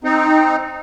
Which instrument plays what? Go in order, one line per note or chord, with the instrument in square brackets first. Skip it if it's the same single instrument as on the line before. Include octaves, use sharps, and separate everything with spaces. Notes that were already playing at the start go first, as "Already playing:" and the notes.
[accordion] C4 D#4